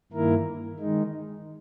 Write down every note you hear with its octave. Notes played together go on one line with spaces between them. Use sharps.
G2 D#3 A#3 E4 A#4
D#3 G#3 D#4